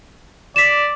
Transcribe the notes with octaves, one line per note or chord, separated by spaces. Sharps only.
D5 B6 E7